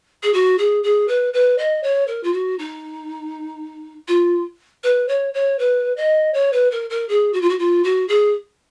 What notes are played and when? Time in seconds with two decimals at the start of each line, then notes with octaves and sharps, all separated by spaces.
0.23 G#4
0.33 F#4
0.58 G#4
0.83 G#4
1.08 B4
1.33 B4
1.58 D#5
1.83 C#5
2.08 A#4
2.23 F4
2.33 F#4
2.59 D#4
4.08 F4
4.84 B4
5.08 C#5
5.34 C#5
5.59 B4
5.97 D#5
6.34 C#5
6.53 B4
6.71 A#4
6.90 A#4
7.09 G#4
7.33 F#4
7.41 F4
7.49 F#4
7.59 F4
7.84 F#4
8.08 G#4